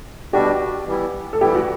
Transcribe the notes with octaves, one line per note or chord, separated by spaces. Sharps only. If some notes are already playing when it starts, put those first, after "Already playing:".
B2 G3 D4 F#4 G4
E3 G3 B3 E4
A4
E3 G3 B3 E4 G4
F#4